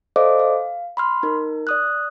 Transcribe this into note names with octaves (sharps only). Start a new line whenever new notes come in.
A4 C5 D5 D#5 F5 D6
F5
B5 C6 F6
D#4 A#4
D5 D#6 F#6